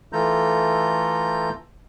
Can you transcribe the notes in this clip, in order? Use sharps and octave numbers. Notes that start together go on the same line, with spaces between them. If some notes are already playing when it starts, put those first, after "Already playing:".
E3 A3 F4 A4 A#5 G6